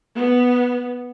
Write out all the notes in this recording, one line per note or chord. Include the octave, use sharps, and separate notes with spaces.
B3